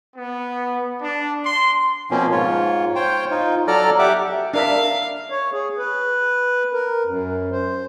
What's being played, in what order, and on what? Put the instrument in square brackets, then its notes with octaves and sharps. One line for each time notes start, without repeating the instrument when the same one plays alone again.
[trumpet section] B3
D4
C6
[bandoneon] B2 F3 A#3 C4 C#4
G#2 F4 C#5
C5 C#5 G5
D#4 F4
F#3 A4 D5 A#5 F6
G4 E5 F#5 D6
[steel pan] D4 A#4 E5 [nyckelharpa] F5
[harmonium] C#5
G#4
B4
A#4
F#2
C5